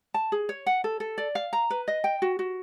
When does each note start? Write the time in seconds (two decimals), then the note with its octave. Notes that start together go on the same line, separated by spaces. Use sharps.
0.14 A5
0.32 G#4
0.49 C#5
0.66 F#5
0.84 A4
1.00 A4
1.18 D5
1.35 F5
1.53 A#5
1.70 B4
1.88 D#5
2.04 G5
2.22 F#4
2.39 F#4